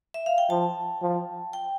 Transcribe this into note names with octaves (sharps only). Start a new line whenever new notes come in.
E5
F5
G5
F3 A5
F3
G5